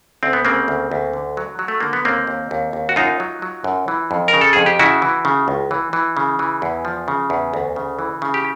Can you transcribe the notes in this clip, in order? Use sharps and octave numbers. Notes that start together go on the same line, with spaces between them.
D2 C4
B3
C#3 A#3 C4
D2
D2
D3
F#3
F#3
A3
D3 A#3
B3
D#2 A#3 C4
D#2
D#2
D#2
F#4
F#2 D#4 F4
F#3
F#3
F#2
E3
F2
A#4
C#3
A4
F2 G#4
G4
C#3 E4 F#4
E3
C#3
C#2
E3
E3
C#3
E3
E2
F3
C#3
E2
D2
C#3
E3
C#3
G4